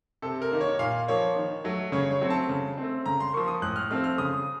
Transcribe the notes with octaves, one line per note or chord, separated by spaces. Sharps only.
C3 A4
A#4
D#3 A#3
C#5
A#2 F5
F3 A#3 C#5
D#3
F#3 A3
C#3 C#5
C#5
F#3 A3 C4
A5
C#3
A3 C4
C#3 A#5
C6
F3 A#3 C#6
D#6
A2 F#6
F6
F3 A3 C4 F6
F6
C#3 D#6